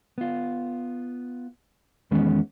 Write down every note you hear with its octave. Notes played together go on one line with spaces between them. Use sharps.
B3 F4
E2 D#3 G#3 B3 C#4